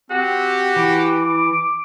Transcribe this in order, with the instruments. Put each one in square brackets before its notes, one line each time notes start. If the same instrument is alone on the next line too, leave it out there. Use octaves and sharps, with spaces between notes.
[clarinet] C4 [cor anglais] F#4 [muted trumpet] G4
[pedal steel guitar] E3 [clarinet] D6